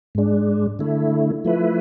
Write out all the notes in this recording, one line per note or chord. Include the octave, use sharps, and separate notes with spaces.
G#2 G#3 D4
D3 A3 E4
F3 A3 E4 B4